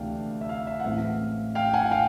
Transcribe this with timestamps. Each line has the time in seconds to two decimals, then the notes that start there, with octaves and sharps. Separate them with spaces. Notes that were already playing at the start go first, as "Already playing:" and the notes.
Already playing: D2 C3 E3 A3 D4 F5 G5
0.41 E5
0.49 F5
0.67 E5
0.80 F#5
0.84 A1 A2 E3 G#3 C4 F5
1.55 F5 G5
1.74 F#5 G#5
1.91 F5 G5